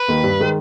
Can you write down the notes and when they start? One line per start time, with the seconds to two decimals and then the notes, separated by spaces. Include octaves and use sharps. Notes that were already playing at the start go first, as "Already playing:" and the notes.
Already playing: B4
0.08 D#2 D#3
0.24 G2
0.40 D#3 G#3